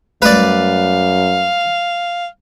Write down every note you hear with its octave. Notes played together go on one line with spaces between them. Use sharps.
F#2 G3 A3 B4 D5 F5